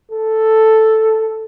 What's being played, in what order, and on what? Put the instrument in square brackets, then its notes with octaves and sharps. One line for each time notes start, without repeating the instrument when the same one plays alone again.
[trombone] A4